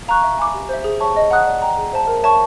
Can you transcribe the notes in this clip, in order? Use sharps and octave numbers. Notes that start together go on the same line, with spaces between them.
F5 A#5 C#6 F#6
E5
G#5 B5 D6
G4
C5 E5
G#4
C#5 E5 A5 C#6
D#5
F#5 A#5 D#6 F#6
D5
G5 A#5
G#4
C5 E5 A5
A#4
C#5 E5 A5 C#6